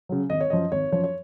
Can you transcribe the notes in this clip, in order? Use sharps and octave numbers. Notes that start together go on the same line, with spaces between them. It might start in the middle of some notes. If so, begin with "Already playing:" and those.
C#3 F#3
G#1 D#5
C#5
F#2 F3 D#5
G#1 C#5
F#2 F3 C#5
C#5